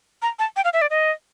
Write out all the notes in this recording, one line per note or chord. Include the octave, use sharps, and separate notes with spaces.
A#5
A5
G5
F5
E5
D5
D#5